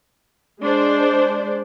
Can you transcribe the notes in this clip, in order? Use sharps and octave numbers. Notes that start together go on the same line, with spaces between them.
G#3 D4 C5 D5